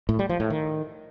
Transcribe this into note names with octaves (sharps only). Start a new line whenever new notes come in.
A2
G3
F3
A2
D#3